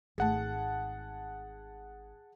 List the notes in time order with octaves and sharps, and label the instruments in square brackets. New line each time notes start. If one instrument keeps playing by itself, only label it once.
[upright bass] G#1 A3 [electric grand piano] G#4 F#5 A5